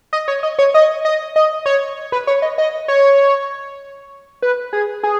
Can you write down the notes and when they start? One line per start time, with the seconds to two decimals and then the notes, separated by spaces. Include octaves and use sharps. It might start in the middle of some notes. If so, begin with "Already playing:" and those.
0.13 D#5
0.28 C#5
0.43 D#5
0.59 C#5
0.74 D#5
1.05 D#5
1.36 D#5
1.66 C#5
2.12 B4
2.27 C#5
2.42 D#5
2.58 D#5
2.88 C#5
4.42 B4
4.73 G#4
5.03 G#4